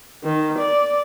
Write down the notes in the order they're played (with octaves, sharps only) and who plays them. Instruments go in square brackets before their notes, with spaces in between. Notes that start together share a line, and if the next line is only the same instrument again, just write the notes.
[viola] D#3
D5